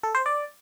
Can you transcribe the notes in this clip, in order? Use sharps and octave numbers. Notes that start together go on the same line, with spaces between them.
A4
C5
D5